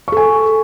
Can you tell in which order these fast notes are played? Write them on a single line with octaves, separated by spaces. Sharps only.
C#6 A4 G#5